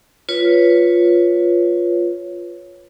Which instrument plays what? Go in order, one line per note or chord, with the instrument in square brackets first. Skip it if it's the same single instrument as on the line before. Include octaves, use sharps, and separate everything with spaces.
[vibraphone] F4 B4 C#5